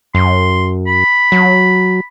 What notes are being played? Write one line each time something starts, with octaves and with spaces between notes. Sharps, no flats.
F#2 C6
B5
F#3